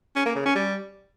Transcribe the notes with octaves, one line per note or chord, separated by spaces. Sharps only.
C#4
A#3
C#3
C#4
G3